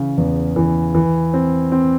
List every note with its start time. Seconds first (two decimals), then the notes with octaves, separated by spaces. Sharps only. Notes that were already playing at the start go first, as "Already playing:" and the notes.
Already playing: C#3 E3
0.18 E2
0.56 E3
0.95 E3
1.34 C4
1.72 C4